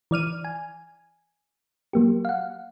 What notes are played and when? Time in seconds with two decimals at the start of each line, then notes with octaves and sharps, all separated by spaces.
0.11 E3 D5 F6 D#7
0.44 G#5
1.93 F#3 A#3 G4
2.25 F5 F#5